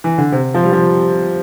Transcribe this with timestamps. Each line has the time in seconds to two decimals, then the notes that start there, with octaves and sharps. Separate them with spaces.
0.04 E3
0.18 D3
0.32 C3
0.54 F3
0.64 G3
0.73 F3